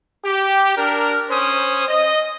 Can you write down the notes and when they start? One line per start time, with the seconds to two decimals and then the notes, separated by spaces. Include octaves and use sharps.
0.25 G4
0.77 D4 A#4
1.30 C#4 C5 D#6
1.87 D#5